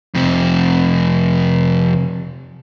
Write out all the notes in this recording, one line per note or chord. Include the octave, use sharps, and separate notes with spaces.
F2 C3